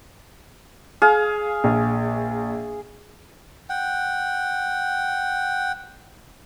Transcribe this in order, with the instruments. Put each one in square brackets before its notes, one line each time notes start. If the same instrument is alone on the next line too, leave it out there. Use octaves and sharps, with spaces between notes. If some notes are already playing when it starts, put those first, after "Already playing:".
[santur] G#4 F5
[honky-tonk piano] A#1
[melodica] F#5 G5